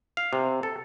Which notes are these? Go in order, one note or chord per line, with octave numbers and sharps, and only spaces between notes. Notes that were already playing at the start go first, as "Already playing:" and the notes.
F5
C3
A4